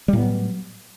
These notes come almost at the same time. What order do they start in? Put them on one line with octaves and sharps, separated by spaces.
G3 A2 B3 F#3